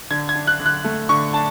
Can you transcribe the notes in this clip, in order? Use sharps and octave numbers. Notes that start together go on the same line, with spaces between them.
D3 G#6
G#6
D4
F#6
D3
F#6
A3
D3 C#6
D4 A5